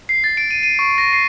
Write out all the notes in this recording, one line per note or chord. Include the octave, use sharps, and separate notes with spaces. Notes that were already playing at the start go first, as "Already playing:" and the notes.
C7
A6
D7
D#7
D#7
C#6
A#6
C7